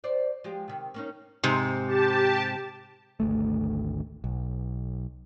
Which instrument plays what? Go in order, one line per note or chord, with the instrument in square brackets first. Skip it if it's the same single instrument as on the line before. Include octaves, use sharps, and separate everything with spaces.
[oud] C5 D5
F3 G#3 G4
C3 D#3
A#3 C#4 D#4
[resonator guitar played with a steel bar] G#2 C3
[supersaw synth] G4 A5
[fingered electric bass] G#1 D2 A3
B1